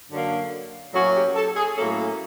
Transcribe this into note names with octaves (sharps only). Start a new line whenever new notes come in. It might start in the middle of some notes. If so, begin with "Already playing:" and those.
F#2 D3 F#3 A#3
A2 F#3 A#3 C#4 F#4
G4
A4
G#4
A2 F#3 A#3 C#4 A4